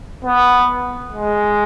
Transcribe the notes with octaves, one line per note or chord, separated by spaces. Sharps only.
B3
G#3